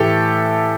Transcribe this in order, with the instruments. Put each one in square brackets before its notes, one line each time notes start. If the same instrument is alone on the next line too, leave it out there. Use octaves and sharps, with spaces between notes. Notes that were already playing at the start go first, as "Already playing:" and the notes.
Already playing: [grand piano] A2 E3 A3 G4 A4